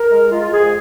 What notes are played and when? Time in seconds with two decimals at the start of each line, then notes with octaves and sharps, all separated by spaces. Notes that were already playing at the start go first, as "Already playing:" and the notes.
Already playing: A#4
0.11 G#3
0.31 G#3 F4
0.52 F2 G#4